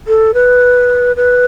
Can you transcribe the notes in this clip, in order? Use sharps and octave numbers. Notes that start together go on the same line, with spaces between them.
A4
B4
B4